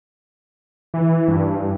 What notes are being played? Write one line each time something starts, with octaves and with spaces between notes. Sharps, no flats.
E3
G2